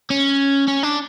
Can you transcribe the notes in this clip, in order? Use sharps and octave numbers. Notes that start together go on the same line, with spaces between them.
C#4
C#4
D4